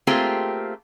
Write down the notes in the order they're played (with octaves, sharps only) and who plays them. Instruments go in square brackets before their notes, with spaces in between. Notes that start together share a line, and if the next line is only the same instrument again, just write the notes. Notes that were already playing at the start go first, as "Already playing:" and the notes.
[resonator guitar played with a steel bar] A3 A#3 C4 F4 G4 G#4